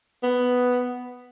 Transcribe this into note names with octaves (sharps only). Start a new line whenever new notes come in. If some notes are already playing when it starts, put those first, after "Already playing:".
B3